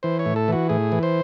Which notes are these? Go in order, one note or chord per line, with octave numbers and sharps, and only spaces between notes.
E3 C5
C#5
A2
A4
E3 F#4
A2 G#4
E3
C5